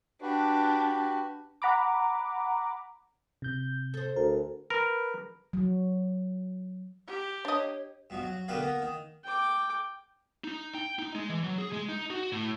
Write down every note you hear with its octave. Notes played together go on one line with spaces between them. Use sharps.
D4 F#4 G4 B4
F#5 A#5 B5 D6
C3 G6
A4 C5
D2 A#4
A#4 B4
F#3
G4
D4 C#5 D#5
G2 B2 F3
F#3
B2 D3 A#3 G4 B4 F5
A#3 B3
D#3
G5 D6
D#4
G5
D#4
G#3
E3
F#3
G#4
G#3
D#4
F#4
A2